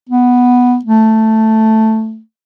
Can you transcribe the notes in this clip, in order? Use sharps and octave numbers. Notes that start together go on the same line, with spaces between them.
B3
A3